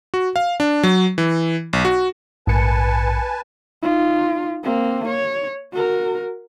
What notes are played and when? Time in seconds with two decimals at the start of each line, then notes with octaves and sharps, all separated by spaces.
0.14 F#4
0.36 F5
0.60 D4
0.83 F#3
1.18 E3
1.73 B1
1.85 F#4
2.47 A#1 G#2 B4 G#5 A5 C#7
3.82 D#4 F4
4.64 A#3 C4
5.08 C#5
5.72 F#4 A#4